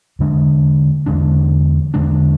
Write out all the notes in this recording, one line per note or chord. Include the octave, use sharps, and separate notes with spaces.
E2 D3 G#3 D4
E2 D3 G#3 D4
E2 D3 G#3 D4